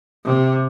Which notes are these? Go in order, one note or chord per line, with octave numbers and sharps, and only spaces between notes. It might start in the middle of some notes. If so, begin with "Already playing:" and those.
C3